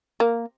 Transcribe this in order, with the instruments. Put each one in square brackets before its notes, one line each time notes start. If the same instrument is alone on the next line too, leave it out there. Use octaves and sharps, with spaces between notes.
[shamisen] A#3